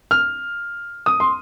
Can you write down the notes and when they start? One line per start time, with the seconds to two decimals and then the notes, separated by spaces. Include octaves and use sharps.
0.11 F6
1.06 D#6
1.20 C6